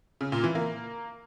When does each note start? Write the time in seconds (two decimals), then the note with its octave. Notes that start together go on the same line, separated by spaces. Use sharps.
0.21 C#3
0.32 A#2
0.44 E3
0.55 A#3